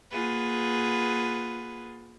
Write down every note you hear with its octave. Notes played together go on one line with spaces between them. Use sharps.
A#3 F4 G#4 B4 F#5